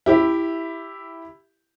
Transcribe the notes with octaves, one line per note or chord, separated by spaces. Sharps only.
E4 G4